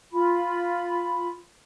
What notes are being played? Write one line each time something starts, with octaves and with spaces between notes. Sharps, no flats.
F4 B5